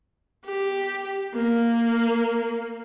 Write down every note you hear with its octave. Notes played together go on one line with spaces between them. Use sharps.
G4
A#3